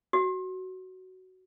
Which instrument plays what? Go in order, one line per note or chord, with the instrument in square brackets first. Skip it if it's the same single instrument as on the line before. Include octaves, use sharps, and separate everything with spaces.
[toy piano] F#4